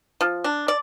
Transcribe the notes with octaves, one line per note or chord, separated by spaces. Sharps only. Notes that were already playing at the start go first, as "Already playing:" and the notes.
F3
D4
D5